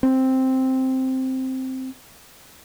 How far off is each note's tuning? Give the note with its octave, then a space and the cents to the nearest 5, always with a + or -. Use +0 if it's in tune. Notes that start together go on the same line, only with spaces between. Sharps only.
C4 +0